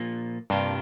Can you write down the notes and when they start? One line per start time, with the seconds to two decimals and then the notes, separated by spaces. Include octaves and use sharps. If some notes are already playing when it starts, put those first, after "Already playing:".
Already playing: A#2 F3 A#3
0.50 G2 C3 G3 A#3 D4 F4